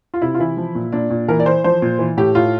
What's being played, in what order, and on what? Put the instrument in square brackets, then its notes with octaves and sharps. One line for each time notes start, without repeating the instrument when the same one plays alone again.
[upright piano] F4
C3 E4
F4
E3 E4
F3
A#2
A#2 D4
A#2
E3 A#4
D5
E3 C5
F3 C5
A#2
E3
A2 G4
A2 F4